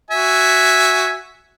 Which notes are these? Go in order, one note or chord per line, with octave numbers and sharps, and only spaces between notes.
F#4 E5 G#5